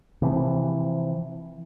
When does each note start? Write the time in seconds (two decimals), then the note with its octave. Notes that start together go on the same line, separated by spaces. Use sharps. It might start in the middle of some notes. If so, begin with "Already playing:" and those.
0.22 C3 E3 F3